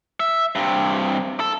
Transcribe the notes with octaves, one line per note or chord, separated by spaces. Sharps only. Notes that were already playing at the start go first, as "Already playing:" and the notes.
E5
G2 C3
A4